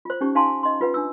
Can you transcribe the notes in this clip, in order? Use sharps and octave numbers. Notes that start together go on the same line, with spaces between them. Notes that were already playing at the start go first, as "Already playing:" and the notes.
F4 C5
C#4 D#4 G4 C#6
D#4 F5 G#5 A5 C6
D#5 C6
F4 B4 F#5
D4 E6